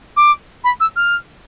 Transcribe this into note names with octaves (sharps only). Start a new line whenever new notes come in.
D6
B5
E6
F6